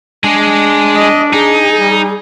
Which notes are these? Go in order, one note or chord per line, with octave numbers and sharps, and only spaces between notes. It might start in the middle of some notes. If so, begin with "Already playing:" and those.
G#3 D4 G#4
D#5
D#4 G#4
G3